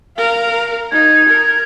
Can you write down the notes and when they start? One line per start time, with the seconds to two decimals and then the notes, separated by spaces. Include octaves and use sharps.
0.17 A#4 F5
0.92 D#4 G#6
1.29 A#4